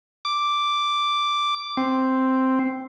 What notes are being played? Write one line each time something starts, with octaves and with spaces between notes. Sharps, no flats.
D6
C4